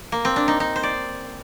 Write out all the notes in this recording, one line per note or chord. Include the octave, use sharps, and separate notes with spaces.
A#3
C4
D4
D#4
D#4
C5
D5